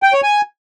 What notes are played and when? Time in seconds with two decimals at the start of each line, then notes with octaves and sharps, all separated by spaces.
0.03 G5
0.13 C#5
0.23 G#5